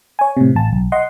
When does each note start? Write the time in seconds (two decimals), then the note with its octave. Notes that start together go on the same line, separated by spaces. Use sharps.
0.19 C#5 G#5
0.37 A2 C3
0.56 A1 A5
0.73 B1
0.92 D#5 F#5 C6